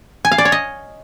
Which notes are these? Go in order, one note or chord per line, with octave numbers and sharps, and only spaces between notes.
G#5
F5
D5
C#5
D#5